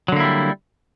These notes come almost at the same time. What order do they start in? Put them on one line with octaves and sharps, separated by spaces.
F#3 D3 A#3 E4 G3